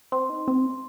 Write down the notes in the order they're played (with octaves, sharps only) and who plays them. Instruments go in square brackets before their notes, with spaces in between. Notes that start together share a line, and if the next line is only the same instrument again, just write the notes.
[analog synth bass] C4 [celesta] C6
[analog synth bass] D#4
C4